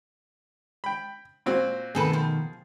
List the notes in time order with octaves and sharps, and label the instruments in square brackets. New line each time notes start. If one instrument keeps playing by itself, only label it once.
[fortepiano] G5 B5
A#2 C4 F#4
[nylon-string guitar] B2 D#3 A3 [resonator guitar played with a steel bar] C4 A4 B4 [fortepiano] G#4
[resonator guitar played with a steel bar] F3